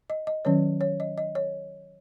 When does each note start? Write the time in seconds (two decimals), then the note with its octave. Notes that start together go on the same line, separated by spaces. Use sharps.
0.10 D#5
0.27 D#5
0.45 D#3 F#3 C#4 C#5
0.81 C#5
1.00 D#5
1.18 D#5
1.35 C#5